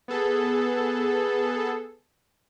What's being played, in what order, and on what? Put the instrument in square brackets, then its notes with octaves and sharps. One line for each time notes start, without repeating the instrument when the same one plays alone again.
[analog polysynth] B3 G#4 A4